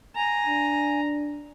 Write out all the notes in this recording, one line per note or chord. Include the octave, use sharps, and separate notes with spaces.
G#5 A#5
D4